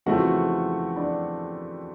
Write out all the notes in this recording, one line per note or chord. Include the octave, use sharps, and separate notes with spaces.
F2 C#3 E3 A3 C4 F#4 F#5
D4 D5